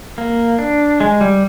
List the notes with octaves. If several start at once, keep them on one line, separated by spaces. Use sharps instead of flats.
A#3
D4
G#3
G3